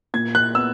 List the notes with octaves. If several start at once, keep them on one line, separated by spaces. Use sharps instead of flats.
A#2 G#6
F#6
B3 E6